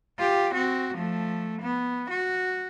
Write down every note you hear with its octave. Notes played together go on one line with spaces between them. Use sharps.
F4 G4
C4 F#4
F3 A3
B3
F#4